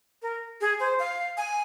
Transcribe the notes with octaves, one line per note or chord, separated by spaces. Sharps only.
A#4
G#4
C5
F5
G#5